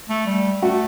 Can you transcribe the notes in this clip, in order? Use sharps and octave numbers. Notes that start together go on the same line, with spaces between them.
A3
G3
A3 F#4